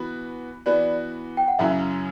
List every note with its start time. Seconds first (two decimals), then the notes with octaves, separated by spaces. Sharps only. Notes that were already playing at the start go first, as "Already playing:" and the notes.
Already playing: E3 B3 F#4 B4
0.66 E3 B3 F#4 B4 D5
1.37 G5
1.48 F#5
1.59 F#2 C#3 F#3 C#4 E4 E5